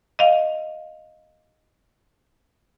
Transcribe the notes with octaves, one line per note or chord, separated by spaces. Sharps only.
D#5 F5